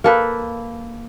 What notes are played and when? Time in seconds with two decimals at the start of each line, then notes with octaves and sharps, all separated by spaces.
0.04 A#3 A4 B4